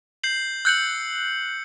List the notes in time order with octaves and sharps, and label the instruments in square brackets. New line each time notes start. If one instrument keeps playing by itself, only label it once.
[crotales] G6 C7 F#7
[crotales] E6 C#7 F#7 [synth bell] F#6 G6